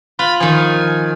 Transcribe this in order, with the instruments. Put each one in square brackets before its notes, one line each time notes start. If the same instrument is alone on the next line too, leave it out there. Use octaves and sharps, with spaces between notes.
[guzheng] F4 [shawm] B5
[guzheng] D#3 F3 [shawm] G#5